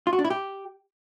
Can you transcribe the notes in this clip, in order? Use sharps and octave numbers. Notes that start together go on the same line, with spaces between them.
F4
F#4
D4
E4
G4